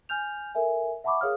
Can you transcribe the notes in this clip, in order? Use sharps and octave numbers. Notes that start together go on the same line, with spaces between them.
G#5 F6 G6 F7
A4 A#4 E5 G#5
E5 F#5 A5 B5 C#6 D6
G#4 A#4 C#5 F5 D#6 F6